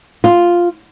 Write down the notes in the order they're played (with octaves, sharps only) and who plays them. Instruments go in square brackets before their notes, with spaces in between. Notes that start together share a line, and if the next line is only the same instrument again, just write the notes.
[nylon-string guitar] F4